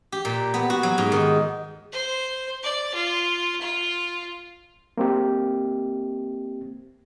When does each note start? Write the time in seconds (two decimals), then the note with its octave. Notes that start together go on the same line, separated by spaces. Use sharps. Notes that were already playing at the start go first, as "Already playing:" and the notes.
0.12 G4
0.25 A#2
0.54 B3
0.70 F#4
0.83 F#3
0.98 G#2
1.12 D#3
1.92 C5
2.63 D5
2.94 F4
3.61 F4
4.97 A#3 C4 G4